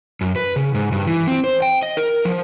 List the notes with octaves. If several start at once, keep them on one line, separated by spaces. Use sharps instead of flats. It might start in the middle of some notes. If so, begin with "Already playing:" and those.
F#2
B4
C#3
G#2
G2
E3
C4
C5
G5
D#5
A#4
F3